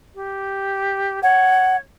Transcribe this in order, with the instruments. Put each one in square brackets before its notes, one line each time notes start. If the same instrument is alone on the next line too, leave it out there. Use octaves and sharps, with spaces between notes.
[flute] G4
[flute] C#5 [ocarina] F#5